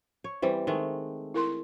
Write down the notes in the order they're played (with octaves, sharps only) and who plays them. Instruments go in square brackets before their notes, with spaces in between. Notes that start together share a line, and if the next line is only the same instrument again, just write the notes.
[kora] C#5
E3 G3 C4
D#3 G#3 A3
[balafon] E4 A#4 C6